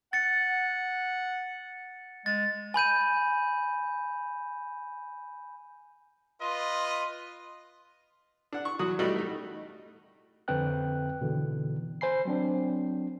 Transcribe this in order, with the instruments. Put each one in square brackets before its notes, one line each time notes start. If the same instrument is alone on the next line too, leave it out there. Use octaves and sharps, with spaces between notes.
[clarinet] F#5 [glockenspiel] A6 C#7
[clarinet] G#3 [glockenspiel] A6
[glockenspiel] G#5 B5 G6 D#7
[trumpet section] F4 B4 D#5 [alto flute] C6
[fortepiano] D4 F#5
C#6
E2 F#3 F#4 D#6
G3 A3 D#4 F#4
A3 D#4
[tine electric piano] F2 D3 C4 B4 G5 F#6
B2 D3 E3
C5 G#5 B5 C7
F#3 C4 D4